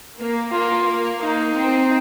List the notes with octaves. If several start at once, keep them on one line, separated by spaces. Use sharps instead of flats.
A#3
A#3 F4
A#3
A#3 D#4
C4